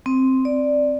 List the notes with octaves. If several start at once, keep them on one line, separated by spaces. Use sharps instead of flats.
C4
D5